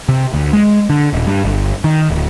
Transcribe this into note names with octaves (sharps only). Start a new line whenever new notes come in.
C3
D2
G#3
D3
D#1
G2
G1
D#3
D1